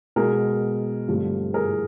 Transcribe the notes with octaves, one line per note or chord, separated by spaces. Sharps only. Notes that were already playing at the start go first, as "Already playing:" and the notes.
B2 G#3 B3 G#4 A#4
G2 D3 F3 A3 C4
G#4 A#4